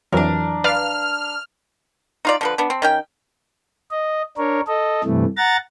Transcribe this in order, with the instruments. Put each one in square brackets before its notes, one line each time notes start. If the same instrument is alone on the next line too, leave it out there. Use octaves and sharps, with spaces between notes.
[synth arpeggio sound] F2 E3 F#3 [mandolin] D4 A#4
[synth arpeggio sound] B4 D5 F5 [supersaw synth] F6
[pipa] D#4 F4 D5
D3 F3 B4
B3 D4
C4
D#3 C#4 G5
[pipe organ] D#5
D4 A#4 C#5
A4 D#5
G2 C3 E3 A3
F#5 A#5 A6